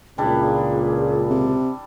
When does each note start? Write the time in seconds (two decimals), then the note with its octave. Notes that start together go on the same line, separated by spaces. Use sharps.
0.18 C#2 A#2 G3 D4 E4 G#4
1.30 C3